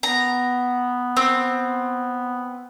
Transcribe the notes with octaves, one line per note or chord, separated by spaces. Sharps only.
B3 A#5
C4